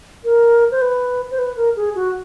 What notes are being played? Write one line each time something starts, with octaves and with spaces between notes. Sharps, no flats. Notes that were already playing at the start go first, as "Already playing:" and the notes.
A#4
C5
B4
C5
B4
A#4
G#4
F#4